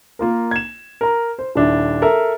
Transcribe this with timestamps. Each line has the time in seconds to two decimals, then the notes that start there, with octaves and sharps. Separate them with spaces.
0.19 A#3 F4 A#4
0.51 G#6 E7
1.01 A#4 A#5
1.39 C5
1.55 D#1 D4 E4
2.02 A4 A#4 E5